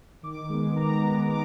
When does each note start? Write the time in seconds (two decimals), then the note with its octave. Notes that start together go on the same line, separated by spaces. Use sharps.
0.23 D#3 D6
0.49 G#3 B3
0.76 D#3 A#5
1.03 G#3 B3
1.29 D#3 D6